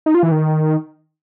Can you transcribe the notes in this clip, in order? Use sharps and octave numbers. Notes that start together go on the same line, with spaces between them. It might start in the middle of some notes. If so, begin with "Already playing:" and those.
D#4
F4
E3
D#3